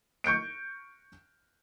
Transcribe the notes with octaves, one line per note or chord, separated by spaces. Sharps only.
C#6 G6 C#7 D7